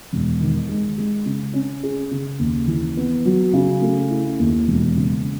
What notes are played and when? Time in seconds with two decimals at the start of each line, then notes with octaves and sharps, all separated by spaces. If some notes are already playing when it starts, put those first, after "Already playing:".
0.13 E1
0.41 D#3
0.69 G#3
0.98 G#3
1.26 C#3
1.54 C#4
1.83 G#4
2.11 C#3
2.39 D#2
2.68 E3
2.97 B3
3.25 F#3
3.53 C#3
3.82 A3
4.10 E4
4.39 D#2
4.68 E1
4.96 C#3